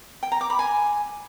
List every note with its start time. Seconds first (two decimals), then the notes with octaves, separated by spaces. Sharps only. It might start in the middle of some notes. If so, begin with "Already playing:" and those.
0.23 G5
0.32 A#5
0.41 D6
0.50 B5
0.59 G#5